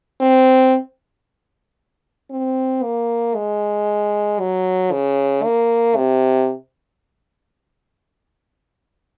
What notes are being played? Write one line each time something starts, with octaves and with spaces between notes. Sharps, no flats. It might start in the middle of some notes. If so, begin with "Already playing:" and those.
C4
C4
A#3
G#3
F#3
C#3
A#3
C3